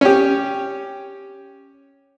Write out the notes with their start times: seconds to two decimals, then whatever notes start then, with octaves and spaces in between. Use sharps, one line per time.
0.01 C#4 G4